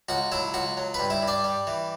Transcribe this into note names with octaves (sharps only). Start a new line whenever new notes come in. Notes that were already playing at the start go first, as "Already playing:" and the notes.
C#2 F#4 F#5
F#3 E4 E5
C#2 F#4 F#5
F#3
G2 B4 B5
E4 E5
G2
D4 D5
G3
E3